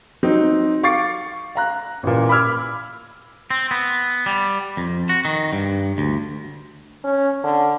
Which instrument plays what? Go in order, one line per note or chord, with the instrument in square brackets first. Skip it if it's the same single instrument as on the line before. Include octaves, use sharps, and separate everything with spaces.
[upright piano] F#3 C4 D#4
F5 C#6 D6 A6 C7 D7
F5 A#5 F#6
A1 A#2
B5 D6 E6 F6 G#6
[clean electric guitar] C4
B3
G3
F2
F#4
D#3
G2
D2
[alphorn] C#4
D3